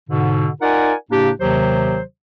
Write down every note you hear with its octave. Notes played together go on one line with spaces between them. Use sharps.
G#2 B2 D3
D#4 F4 A#4 D5 F#5 G#5
A2 C#3 A#3 D4 G4
D#2 C3 D#3 F#3 G4 C5